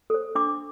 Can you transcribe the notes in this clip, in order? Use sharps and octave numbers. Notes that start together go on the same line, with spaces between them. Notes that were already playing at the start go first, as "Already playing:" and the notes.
A4 C5
D4 D6